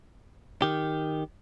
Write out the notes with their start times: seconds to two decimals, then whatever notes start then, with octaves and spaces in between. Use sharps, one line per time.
0.62 D#3 G4